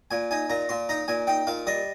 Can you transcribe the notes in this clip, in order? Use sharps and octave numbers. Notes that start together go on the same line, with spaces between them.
A#2 G#5
D#4 G#5
A#2 A#5
A#2 C6
D#4 A#5
A#2 G#5
D#4 G5
A#2 F5
G3 D#5